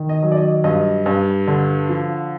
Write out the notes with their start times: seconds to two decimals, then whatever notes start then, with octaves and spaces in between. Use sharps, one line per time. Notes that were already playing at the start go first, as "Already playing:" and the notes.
Already playing: D#3
0.09 D#5
0.23 F#3
0.32 D5
0.37 D#5
0.64 G2 D#5
1.06 G2
1.47 D3
1.89 F3